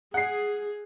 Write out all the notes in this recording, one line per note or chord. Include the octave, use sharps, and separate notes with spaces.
G#4 F#5 C7